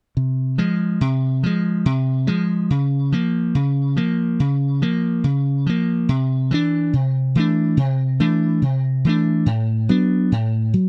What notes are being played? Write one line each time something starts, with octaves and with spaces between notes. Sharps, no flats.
C3
F3 G#3
C3
F3 G#3
C3
F3 G#3
C#3
F3 A#3
C#3
F3 A#3
C#3
F3 A#3
C#3
F3 A#3
C3
E3 A3 D4
C3
E3 A3 D4
C3
E3 A3 D4
C3
E3 A3 D4
A2
F#3 B3 D4
A2
F#3